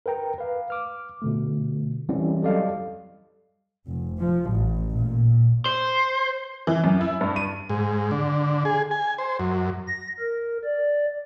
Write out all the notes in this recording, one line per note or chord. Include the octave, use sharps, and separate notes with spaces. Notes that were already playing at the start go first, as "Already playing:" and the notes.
A#4 B4 G5 A#5
B4 F5
D6 F6
B2 D3 A3
E3 G3 C4 C#4 E4
F#3 G3 A4 D5 D#5 F5
F1
F3
A1
A#2
C5
E3
F#2
E4
G2
D#7
G#2
D3
G#4
G#5
C5
F#2
A#6
A#4
D5